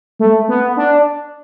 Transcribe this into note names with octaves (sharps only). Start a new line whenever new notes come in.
A3
B3
D4